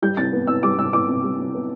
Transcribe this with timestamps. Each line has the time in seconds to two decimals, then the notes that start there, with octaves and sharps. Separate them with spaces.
0.02 G3 G6
0.17 C3 A6
0.33 B3
0.47 C3 E6
0.63 G3 D6
0.78 C3 E6
0.93 B3 D6
1.09 C3
1.24 G3
1.39 C3
1.54 B3